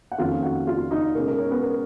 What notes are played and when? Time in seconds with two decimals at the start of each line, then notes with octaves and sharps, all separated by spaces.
0.12 F#5
0.18 F2 D#3 A#3 C#4 F4 F5
0.43 F#4 F#5
0.67 F4 F5
0.91 D#4 D#5
1.15 B2 G#3 C#4 A#4
1.28 A#4
1.39 C#4 C#5
1.51 B3 B4
1.63 A#4